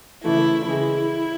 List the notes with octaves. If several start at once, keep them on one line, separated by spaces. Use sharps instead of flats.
C#3 E3 A3 E4
C#3 E3 G#3 E4